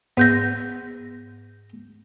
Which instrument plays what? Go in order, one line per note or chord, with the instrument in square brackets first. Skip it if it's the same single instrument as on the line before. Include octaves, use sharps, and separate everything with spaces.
[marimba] G#2 G6 A#6 [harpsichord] B3 E5